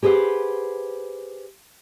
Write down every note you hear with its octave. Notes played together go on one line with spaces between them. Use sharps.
G4 G#4 B4 C5 F#5